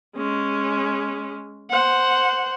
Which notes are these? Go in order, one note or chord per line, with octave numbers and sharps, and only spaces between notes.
G#3 C#4
C5 F#5